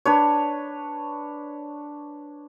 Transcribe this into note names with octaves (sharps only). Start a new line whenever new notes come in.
D4 B4 C#5